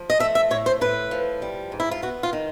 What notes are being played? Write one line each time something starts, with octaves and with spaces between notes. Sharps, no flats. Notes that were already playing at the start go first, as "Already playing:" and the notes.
Already playing: F3
D#5
A3 E5
E5
A2 C#5
C5
A2 B4
F3
G3
G#2
E4
F4
B3 F#4
F4
D#3